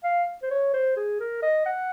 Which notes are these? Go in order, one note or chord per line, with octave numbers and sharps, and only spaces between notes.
F5
C5
C#5
C5
G#4
A#4
D#5
F#5